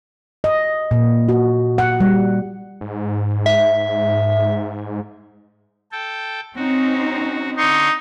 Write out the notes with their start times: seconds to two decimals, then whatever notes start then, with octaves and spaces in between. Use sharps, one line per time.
0.44 D#5
0.91 A#2
1.29 F#4
1.78 F#5
2.00 G3
2.81 G#2
3.46 E5
5.92 A4 G5
6.56 C4 C#4 D#4 F#4
7.57 D3 D#4 C6 C#6